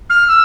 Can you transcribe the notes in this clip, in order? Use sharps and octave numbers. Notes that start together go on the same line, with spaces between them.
F6
E6